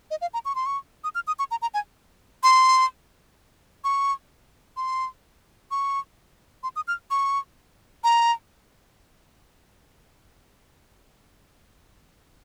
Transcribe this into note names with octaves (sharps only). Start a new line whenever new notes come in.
D#5
F5
A#5
C#6
C6
C#6
D#6
F6
D#6
C#6
A#5
A#5
G#5
C6
C#6
C6
C#6
C6
D#6
F6
C#6
A#5